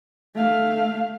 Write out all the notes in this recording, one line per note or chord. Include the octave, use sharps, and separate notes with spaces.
A3 F5